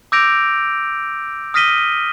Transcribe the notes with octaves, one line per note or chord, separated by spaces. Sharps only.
D6 E6 G6 A#6 D7 F7
D#6 F6 A#6 B6 D#7 G7